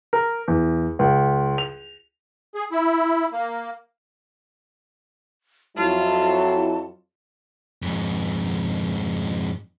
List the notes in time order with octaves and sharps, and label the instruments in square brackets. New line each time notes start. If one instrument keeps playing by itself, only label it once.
[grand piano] A#4
E2
C#2
F7
[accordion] G#4
E4
A#3
[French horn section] F2 F#3 E4 [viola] F4 [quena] A5
[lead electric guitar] F2 G#2